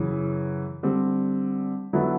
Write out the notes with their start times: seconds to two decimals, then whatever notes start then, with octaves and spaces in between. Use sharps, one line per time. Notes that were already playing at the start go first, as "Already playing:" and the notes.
Already playing: F#2 C#3 E3
0.83 D3 G3 C4
1.93 D3 F#3 B3 E4 A4